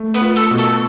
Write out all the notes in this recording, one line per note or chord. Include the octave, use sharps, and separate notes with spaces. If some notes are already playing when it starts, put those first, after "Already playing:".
Already playing: A3
B3 B4
F4
A3 A4
B2
A3 A4